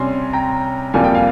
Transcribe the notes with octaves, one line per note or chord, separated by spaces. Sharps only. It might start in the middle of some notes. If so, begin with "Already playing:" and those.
Already playing: C3 G3 C#4 G#5 C6
G5 A#5
F2 C3 G3 A#3 G#5
G5
F5 G#5